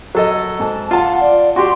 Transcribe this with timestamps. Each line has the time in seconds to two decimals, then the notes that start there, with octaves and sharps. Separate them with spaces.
0.15 F#3 A4 D#5
0.60 G#2 A5
0.91 F4 F#5 A5
1.20 D5
1.56 F#4 G4 C6